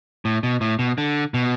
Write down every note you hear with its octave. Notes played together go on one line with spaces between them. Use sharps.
A2
B2
A2
B2
D3
B2